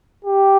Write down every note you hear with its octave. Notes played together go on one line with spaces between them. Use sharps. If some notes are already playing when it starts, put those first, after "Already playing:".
G4